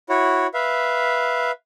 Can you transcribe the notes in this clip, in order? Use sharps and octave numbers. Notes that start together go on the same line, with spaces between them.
E4 F#4 C#5
B4 E5 F5